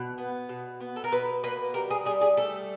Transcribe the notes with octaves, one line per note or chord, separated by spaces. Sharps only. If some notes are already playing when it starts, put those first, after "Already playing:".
Already playing: B2
B3
B2
B3
A4
A#4
B2 B4
A#3 B4
G3 A#4
G#4
G3 G#4
G#4
A3 A4